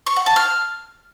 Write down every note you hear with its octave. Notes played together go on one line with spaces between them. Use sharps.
C#6
F#5
A5
F6